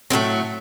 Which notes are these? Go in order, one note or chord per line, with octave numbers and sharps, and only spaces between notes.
A2 F#3 A3 C4